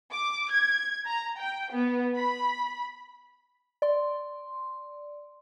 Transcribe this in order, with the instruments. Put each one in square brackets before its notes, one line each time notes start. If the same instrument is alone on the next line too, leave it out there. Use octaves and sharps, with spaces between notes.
[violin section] D6
G#6
A#5
G5
B3
B5
[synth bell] D5 C6